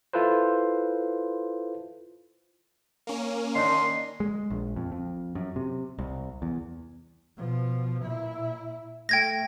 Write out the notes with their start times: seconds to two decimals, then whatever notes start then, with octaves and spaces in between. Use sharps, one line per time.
0.13 E4 F4 A4 B4 C5
3.07 A#3 C#4
3.55 D#3 D4 D#4 C6
4.20 G#3
4.50 A#1
4.76 F2
4.92 F2
5.35 F#2
5.56 C3
5.99 C2
6.42 E2
7.37 B2 F3
8.02 A#2 E4
9.09 A3 G5 G#6 A#6